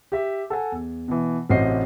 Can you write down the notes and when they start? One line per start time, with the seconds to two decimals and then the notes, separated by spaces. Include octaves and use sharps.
0.12 G4 E5
0.50 A4 F#5 G#5
0.72 E2
1.08 B2 E3
1.50 A1 C3 F#4 C5 D#5 C7